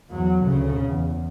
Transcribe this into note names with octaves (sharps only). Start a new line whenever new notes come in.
E2 F#3
D2 C#3
E2